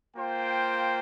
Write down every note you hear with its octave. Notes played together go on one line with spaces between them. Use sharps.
A#3 F4 C5 G5